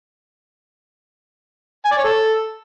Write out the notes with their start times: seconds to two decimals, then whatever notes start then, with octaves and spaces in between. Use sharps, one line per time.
1.85 G#5
1.91 D5
1.98 C#5
2.04 A4